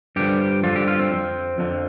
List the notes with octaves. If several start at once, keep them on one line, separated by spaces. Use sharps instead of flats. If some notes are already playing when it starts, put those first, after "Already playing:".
G2 D3 F3 G4
G2 D3 F3 F4
G4
F4
C4
F2 F3
F2 D3 F3